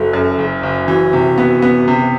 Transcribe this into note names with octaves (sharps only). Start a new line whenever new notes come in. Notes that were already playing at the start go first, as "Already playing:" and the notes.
Already playing: F#1 F#3 A4
F#2
F#1
F#1
E3 F#4
C3
B3
B3
C3